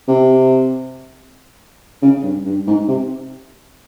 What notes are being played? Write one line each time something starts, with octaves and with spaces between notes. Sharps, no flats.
C3
C#3
G2
G2
G#2
C3